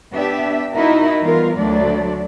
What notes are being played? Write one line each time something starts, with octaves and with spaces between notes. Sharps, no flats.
B3 D4 G4 E5
D#4 E4 F#4 A#4 E5
E3 G3 B3 F4 A#4
D2 F#3 A3 D4 D5